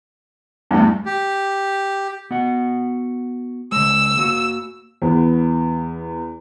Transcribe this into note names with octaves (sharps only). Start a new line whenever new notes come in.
E2 G2 G3 A3
G4
B3 F#4 F#5
C#3 G#3 E6
A#3 F#4
E2 B3